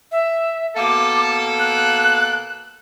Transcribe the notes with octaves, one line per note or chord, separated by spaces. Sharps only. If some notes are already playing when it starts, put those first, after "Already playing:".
E5
B2 A#3 A4 D6
F#6